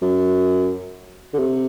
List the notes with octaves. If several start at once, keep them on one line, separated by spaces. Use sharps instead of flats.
F#2
D3
C3